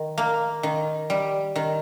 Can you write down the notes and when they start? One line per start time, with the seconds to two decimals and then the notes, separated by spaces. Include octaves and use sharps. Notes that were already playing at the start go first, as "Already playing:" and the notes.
Already playing: D#3
0.18 A#3
0.63 D#3
1.10 G3
1.56 D#3